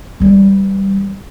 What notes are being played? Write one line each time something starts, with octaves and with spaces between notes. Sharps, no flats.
E3 G3